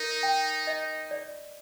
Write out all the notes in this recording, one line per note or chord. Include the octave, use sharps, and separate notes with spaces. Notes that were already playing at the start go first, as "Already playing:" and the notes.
Already playing: D#4 A#4
G5
D#5
D5